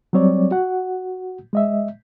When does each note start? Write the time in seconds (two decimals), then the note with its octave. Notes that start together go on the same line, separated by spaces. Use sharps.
0.13 F#3 G3 C4 C#5 D5
0.51 F#4 F#5
1.53 G#3 D#5 E5